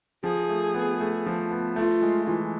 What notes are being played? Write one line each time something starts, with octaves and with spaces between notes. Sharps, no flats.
F3 G#4
A3
B3
A3
F3
B3
A3 F4
G#3
E3